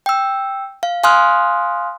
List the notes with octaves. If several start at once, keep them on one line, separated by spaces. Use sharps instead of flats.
G5 E6
F5
F5 G#5 C6 D#6 F6 F#6